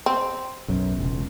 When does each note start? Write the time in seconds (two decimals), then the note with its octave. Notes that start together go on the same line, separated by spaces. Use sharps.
0.06 C4
0.68 B1 F#2
0.98 E1 C#2